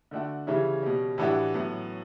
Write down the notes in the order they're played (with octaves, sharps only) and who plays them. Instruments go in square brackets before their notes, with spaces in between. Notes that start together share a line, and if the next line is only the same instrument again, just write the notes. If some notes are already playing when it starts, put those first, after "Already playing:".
[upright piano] D3 A3 D4 F#4
C#3 E3 G3 C#4 E4
B2 G3 C#4
A2 E3 G3 D4 F#4
A2 F#3 B3